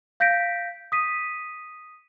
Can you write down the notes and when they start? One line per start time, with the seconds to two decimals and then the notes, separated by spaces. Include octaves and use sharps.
0.20 F5 G6 A#6 B6 D7
0.92 D#6 B6 D#7